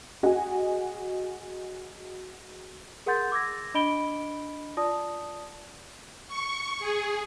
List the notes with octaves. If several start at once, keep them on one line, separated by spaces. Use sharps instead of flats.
F#4 G#4 D#5 F#5 G#5
G#4 A#4 F#5 C6 G6 A6
D6 E6 G#6 A#6
D4 D#5 B5 D7 G7
F4 D5 A5 D#6
C#6
G#4